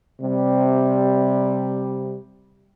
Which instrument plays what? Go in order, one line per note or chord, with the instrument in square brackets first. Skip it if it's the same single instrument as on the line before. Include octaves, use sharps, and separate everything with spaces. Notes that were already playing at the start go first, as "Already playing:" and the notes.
[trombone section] C3 G3